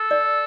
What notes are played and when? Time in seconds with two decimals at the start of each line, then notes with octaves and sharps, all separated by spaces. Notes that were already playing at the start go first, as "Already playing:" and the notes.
Already playing: A4
0.11 D5